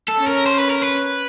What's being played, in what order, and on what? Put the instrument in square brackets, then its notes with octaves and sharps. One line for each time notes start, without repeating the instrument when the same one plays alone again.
[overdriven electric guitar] A4
[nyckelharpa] C#4
[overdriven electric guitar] A#4
C5
B4
A#4
B4